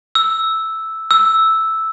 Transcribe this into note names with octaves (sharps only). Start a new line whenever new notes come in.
E6
E6